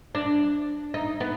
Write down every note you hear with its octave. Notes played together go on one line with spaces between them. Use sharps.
D4
D#4
B3